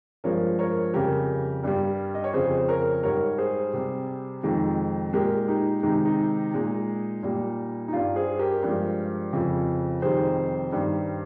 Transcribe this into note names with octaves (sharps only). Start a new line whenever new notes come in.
G2 F3 G#3 A#4 C#5
A#4 C#5
F2 C#3 G3 G4 A#4
G2 G3
D#5
C#5
F2 C#3 F3 G#4 C5
C5
A#4 C#5
G#2 G3 A#4 C#5
G#4 C5
C3 G3
F2 C3 D#3 G#3
A#2 G#3 G4 A#4
D#4 G4
C3 D#3 G#3 D#4
D#4
A#2 G#3
A#2 G3
D#4
G2 G3 F4
G#4 C5
G4 A#4
G2 F3 G#3
F2 C#3 F3
F2 C3 D#3 G3 G#4 C5
G2 D#3 G3